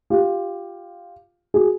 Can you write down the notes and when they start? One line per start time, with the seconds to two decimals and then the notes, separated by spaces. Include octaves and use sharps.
0.10 F4 G4
1.54 F#4 G#4